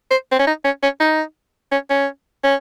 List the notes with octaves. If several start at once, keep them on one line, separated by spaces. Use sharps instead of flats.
C5
C4
C#4
D#4
C#4
C#4
D#4
C#4
C#4
C#4